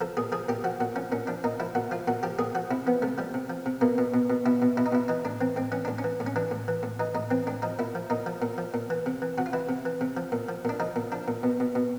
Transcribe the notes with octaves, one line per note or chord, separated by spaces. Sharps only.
F3 A4
A#2 G#4
F3 G#4
A#2 G4
F3 F#4
A#2 F#4
F3 C#4
A#2 C#4
F3 D4
A#2 D#4
F3 E4
A#2 F#4
F3 F4
A#2 F#4
F3 G4
A#2 G#4
F3 F#4
C3 E4
F3 B3
C3 A3
F3 G3
C3
F3
C3
B2 A#3
B2
B2
B2
B2 E4
B2
B2 E4
D#4
B2 E4
E3 D#4
A2 D4
E3 C4
A2 C4
E3 C#4
A2 D4
C#4
E3
A2
C#4
E3 D4
A2
E3
A2
E3 D#4
A2 D#4
E3 C4
A2 D4
F3 D#4
A#2 E4
F3
A#2 D#4
F3
A#2
F3
A#2
E3
C3
E3
C3 F#4
F4
E3 E4
C3
E3
C3
F3
A#2
F3
A#2 D4
F3 D#4
A#2
F3 D4
A#2
B2
B2
B2